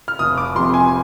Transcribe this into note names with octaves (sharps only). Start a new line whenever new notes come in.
F6
F1 D#6
D6
F2 C3 F3 C6
G#5